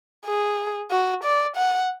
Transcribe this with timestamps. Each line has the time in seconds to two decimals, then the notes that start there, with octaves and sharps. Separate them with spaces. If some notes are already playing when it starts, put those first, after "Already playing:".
0.26 G#4
0.91 F#4
1.24 D5
1.56 F#5